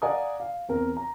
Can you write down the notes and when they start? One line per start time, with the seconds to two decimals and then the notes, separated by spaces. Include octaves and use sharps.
0.02 D5 F5 F#5 G#5 A#5 D#6
0.40 F5
0.69 E2 C4 A#4
0.97 A#5